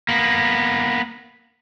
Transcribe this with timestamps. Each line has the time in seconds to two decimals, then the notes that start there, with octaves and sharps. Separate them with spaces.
0.09 A#3 B3